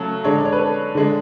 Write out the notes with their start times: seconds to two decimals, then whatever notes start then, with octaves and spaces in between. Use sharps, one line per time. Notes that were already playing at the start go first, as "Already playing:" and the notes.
Already playing: C#3 F#3 A3 A4
0.24 D3 G#3 D4 C#5
0.38 D5
0.45 C#5
0.52 B4
0.59 A4
0.95 D3 G#3 D4